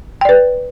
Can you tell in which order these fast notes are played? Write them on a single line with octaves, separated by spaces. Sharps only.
G5 D5 B4